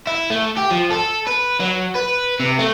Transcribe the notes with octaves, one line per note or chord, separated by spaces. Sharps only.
E4
A3
G4
F3
A4
B4
F#3
B4
C3
A3